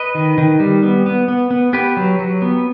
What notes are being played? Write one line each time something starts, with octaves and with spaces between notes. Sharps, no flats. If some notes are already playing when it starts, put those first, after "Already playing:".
Already playing: B4 D#5
D#3
D#3
G3
B3
B3
B3
B3
B3 G4 B4
F#3
F#3
B3